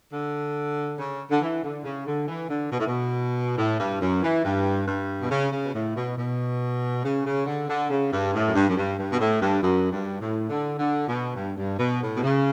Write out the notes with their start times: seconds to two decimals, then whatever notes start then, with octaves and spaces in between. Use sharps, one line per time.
0.12 D3
0.98 C#3
1.30 D3
1.42 E3
1.64 D3
1.84 C#3
2.07 D3
2.28 E3
2.49 D3
2.72 B2
2.79 A2
2.87 B2
3.58 A2
3.80 G2
4.01 F#2
4.22 E3
4.45 G2
4.88 G2
5.22 B2
5.31 C#3
5.52 C#3
5.65 B2
5.74 A2
5.96 B2
6.18 B2
7.04 C#3
7.26 C#3
7.46 D3
7.69 D3
7.90 C#3
8.12 G2
8.33 A2
8.48 F#2
8.55 G2
8.69 F#2
8.77 G2
8.99 G2
9.12 B2
9.20 A2
9.41 G2
9.63 F#2
9.92 G2
10.21 A2
10.49 D3
10.79 D3
11.08 B2
11.36 G2
11.57 G2
11.79 B2
12.02 A2
12.16 B2
12.23 C#3